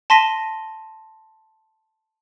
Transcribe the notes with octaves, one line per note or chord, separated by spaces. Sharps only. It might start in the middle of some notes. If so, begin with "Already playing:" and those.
A5 C6 A#6 B6 D#7